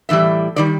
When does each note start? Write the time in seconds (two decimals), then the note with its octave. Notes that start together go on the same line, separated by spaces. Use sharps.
0.09 A2 E3 G3 E5
0.56 D#3 G3 D5